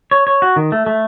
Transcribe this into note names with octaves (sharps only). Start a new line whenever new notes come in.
C#5
C#5
F#4
D#3
A3
A3